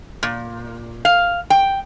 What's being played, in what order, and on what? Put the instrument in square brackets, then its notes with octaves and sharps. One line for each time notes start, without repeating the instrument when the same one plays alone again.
[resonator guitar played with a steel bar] A#2
F5
G5